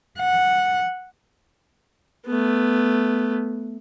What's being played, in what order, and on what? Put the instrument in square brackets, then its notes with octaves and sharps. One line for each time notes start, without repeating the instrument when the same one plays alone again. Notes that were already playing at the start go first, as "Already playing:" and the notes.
[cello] F#5
[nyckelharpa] A3 B3